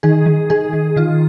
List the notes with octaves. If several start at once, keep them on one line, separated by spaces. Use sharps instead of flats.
D#3 G#4
D#3
D#3 G#4
D#3
D#3 F4